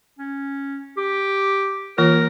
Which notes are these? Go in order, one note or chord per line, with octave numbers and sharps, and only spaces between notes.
C#4
G4
E3 A#3 F4 A#4